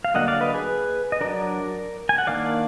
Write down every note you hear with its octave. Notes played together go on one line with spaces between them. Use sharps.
F5
D3 F#3 A#3 D4 D#5 F#5
D5 F5
B4 D#5
G#4 B4
D#5
F#3 D4 A#4 D5
G#5
F#5
D#3 A#3 D4 D5 F5